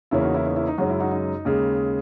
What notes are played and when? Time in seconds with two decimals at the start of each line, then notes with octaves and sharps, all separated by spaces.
0.11 E2 C#3 E3 A#3 C#4 E4
0.23 D#4 F#4
0.34 E4
0.45 D#4
0.56 E4
0.67 D#4
0.78 F#2 C#3 G#3 C#4 D#4 F#4
0.89 E4
1.00 D#4 F#4
1.11 D#4
1.45 D#2 C#3 G#3